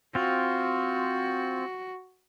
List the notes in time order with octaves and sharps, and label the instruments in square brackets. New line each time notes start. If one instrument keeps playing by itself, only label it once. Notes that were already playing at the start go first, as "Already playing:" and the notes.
[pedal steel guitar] C4 F4 [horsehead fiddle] F#4